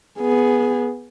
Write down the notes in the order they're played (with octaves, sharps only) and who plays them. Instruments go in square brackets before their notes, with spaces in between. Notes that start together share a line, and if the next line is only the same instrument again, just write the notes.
[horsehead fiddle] B3 G#4